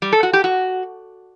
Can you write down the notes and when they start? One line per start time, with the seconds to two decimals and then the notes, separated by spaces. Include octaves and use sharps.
0.02 G3
0.12 A4
0.23 F#4
0.33 G4
0.44 F#4